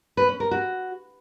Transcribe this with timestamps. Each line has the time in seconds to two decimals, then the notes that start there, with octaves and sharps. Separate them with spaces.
0.17 B4
0.29 C#4
0.40 A#4
0.51 F#4